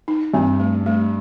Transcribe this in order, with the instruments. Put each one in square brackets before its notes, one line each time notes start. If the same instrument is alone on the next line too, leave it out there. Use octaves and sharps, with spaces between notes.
[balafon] D#4
[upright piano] G2 [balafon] C4
[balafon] A3
A3